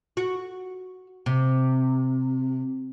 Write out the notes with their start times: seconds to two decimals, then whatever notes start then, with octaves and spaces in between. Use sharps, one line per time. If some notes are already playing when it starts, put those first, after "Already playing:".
0.17 F#4
1.26 C3